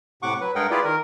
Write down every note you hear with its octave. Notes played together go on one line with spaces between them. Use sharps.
A2 C3 F#5 C#6 D6
F#3 B4
G2 G#3 G#4 A#4 F#5 G5
E4 F4 G4 G#4 B4 D5
D#3 A#4